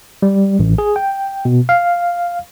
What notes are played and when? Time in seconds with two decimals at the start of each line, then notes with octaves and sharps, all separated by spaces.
0.22 G3
0.59 A1
0.78 G#4
0.96 G5
1.45 B2
1.69 F5